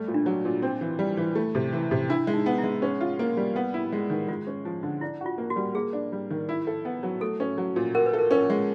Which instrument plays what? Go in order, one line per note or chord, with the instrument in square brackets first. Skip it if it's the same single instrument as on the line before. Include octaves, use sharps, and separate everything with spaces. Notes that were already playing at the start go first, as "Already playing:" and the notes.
Already playing: [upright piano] G3 A3
A#2
[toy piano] D4
[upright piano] F#3
A#2
C4
E3
G3
E3
A3
C3
E3
C3
[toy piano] D4 [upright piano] E4
[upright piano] G#3
[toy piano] D#4
[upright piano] B3
[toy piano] E4
[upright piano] G#3
C#4
F4
A#3
G3
B3
E4
G#3
D#3
[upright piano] G#3 [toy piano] F4
[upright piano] C#4
F3
D3
[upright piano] D4 [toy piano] E4
[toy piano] F4 [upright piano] F#4
[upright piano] A#3
[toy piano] F#4
[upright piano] G3
[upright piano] A#3 [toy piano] G#4
[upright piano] D4
G3
D#3
E4
A4
B3
F#3
[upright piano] A3 [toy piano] A4
[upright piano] C#4
F#3
A#2
[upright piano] F#4 [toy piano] A#4
[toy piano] B4
[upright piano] A4
[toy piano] A#4
[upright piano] C#4 [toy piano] A#4
[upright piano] G#3